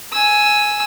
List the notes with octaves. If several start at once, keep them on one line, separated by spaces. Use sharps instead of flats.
G#5 E6